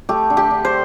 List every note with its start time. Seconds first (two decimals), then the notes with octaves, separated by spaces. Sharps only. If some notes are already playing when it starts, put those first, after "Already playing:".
0.09 A3 G4
0.30 D3
0.37 G4
0.51 D3
0.65 C5